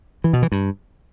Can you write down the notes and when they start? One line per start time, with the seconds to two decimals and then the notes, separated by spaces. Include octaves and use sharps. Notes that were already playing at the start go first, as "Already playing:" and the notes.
0.24 E3
0.33 B2
0.43 E3
0.52 G2